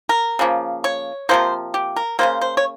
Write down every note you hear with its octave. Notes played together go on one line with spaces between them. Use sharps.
A#4
C#3 F3 A#3
C#5
C3 F3 A#3 C5
G4
A#4
C#3 G3 A#3 C5
C5
C#5